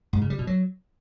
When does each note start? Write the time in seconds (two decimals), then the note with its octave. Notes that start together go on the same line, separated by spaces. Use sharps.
0.13 G#2
0.21 C#3
0.30 G3
0.39 B2
0.47 F#3